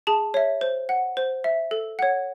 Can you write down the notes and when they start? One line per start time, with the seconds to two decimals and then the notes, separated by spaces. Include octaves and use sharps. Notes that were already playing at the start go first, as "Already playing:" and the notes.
0.07 G#4 A5
0.34 C#5 E5
0.61 C5
0.89 F#5
1.17 C5
1.44 E5
1.71 A4
1.99 C#5 F#5